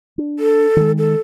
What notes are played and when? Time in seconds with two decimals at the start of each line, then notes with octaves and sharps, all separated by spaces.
0.18 D4
0.39 A4
0.76 D#3 G#3
0.98 A4